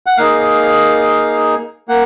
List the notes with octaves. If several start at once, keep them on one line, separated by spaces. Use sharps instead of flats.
F#5
A#3 D#4 G#4 F5
A#3 F#5